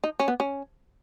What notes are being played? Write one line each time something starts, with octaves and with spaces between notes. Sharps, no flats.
D#4
C#4
B3
C#4